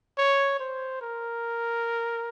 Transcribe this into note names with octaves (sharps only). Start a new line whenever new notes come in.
C#5
C5
A#4